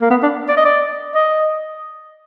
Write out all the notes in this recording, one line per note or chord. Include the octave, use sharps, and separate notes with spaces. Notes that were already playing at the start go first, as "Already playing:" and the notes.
A#3
B3
D4
D5
D#5
D5
D#5